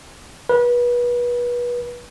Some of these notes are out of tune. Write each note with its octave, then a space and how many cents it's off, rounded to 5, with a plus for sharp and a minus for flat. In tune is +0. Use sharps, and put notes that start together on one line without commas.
B4 -30